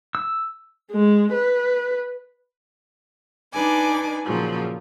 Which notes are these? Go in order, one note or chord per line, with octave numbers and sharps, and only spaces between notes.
E6
G#3
B4
D4 D#4 B4 G#5 D6
A#2 C#3 F3 F#3